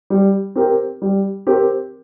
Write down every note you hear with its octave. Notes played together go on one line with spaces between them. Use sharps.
G3
C4 G4 A#4
G3
C4 G4 A#4